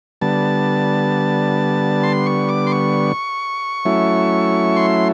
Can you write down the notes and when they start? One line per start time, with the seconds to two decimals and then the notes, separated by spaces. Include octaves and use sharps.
0.21 D3 G3 B3 A5
2.03 C6
2.26 C#6
2.49 D6
2.67 C6
2.72 C#6
3.85 F#3 A3 C#4 E4
4.76 C6